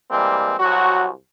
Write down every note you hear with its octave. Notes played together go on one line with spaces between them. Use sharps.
E3 G3 G#3 A#3 C4
C2 F#3 F#4